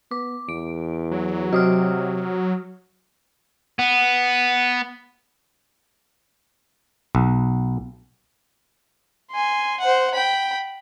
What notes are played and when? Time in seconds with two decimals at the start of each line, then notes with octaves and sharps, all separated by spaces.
0.11 B3 D6
0.49 E2 D7
1.11 F#3
1.53 C3 F#4 D#6 F6
3.79 B3
7.15 B1
9.31 G#5 C6
9.80 C5 F#5
10.15 G5 B5